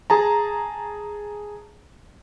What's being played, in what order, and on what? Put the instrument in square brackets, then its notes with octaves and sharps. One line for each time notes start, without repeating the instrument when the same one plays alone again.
[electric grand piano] G#4 A5 A#5